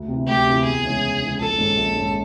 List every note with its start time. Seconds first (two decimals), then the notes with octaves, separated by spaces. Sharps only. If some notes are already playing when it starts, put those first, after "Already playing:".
Already playing: D2
0.08 C3 E3
0.27 D2 G4
0.46 C3 E3
0.64 E2 G#4
0.83 C#3 E3 G#3 C#4
1.02 E2
1.20 C#3 E3 G#3 C#4
1.39 A#1 A4
1.58 G#2 D#3 G#3 C#4
1.77 A#1
1.96 G#2 D#3 G#3 C#4